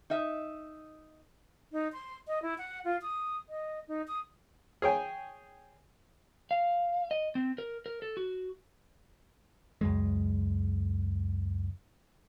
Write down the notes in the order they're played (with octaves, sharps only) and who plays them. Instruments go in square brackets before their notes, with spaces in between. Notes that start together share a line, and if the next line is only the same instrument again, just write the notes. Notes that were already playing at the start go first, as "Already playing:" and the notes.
[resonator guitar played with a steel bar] D#4 D#5 E5
[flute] D#4
C6
D#5
E4
F#5
F4
D#6
D#5
D#4
D#6
[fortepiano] G#4 C#5 G5 G#5
[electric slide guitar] F5
D#5
C4
A#4
A#4
A4
F#4
[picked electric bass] C#2 F#2 G#3